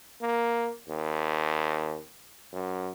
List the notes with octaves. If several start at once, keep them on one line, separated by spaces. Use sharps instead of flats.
A#3
D#2
F#2